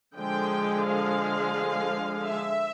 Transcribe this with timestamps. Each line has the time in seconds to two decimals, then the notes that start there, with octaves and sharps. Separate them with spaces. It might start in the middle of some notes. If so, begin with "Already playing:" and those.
0.16 D3 F3 G#3 G5
0.86 F5
2.24 E5